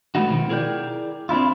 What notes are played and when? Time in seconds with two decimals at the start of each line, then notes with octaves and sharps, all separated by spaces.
0.15 G#3 A3 B3 D#4 F#4
0.29 B2 D#3 F3
0.49 E4 G#4 A#4 C5 D5 G5
1.29 C4 D4 E4 F4